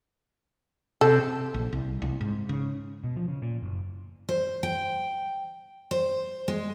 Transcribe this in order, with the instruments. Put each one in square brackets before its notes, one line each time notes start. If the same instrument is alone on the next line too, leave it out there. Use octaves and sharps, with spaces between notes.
[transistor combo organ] C3 [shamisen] A4
[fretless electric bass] A#1
C2
C2
G#2
C#3
[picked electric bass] B2
F3
C#3
A#2
F#1
[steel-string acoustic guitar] C5
G5
C5
G#3